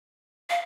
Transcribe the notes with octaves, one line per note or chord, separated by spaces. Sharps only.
F5